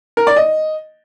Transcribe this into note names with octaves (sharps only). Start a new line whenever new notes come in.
A#4
D5
D#5